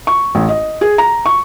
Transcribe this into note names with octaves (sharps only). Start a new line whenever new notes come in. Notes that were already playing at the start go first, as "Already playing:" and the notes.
C#6
A1
D#5
G#4
A#5
C#6